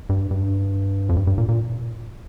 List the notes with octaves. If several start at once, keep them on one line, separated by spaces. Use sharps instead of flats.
G2
G2
F2
G2
G2
A#2
A#2